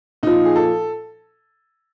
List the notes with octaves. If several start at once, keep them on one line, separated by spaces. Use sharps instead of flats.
A#2 F3 D#4
G#4
A4